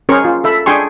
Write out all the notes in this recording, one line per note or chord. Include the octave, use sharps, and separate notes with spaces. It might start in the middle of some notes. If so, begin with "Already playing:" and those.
C#4 G#4 A#4 C5 C#6
F4
A4 E5 B5
D4 G#4 G5 G#5 C6 C#6